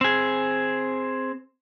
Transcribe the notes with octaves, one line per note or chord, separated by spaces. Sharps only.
C4 G#4